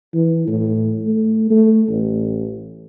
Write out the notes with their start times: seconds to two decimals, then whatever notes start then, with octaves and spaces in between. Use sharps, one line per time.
0.14 E3
0.47 A2
1.03 A3
1.50 A3
1.89 A1